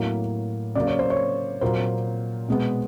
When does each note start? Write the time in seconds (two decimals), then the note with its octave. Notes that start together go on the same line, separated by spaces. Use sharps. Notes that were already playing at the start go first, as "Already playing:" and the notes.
Already playing: A2 F#3 A#3
0.75 C#3 F#3 A#3 D5
0.87 C#5
0.99 C5
1.10 C#5
1.61 A#2 F#3 A#3 C5
2.48 B2 G#3 B3